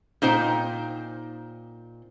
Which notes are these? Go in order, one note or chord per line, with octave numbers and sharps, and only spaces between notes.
A#2 D#4 C5 G5